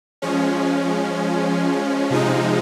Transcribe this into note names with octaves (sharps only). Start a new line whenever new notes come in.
F3 G#3 C#4
C3 F3 G#3 D#4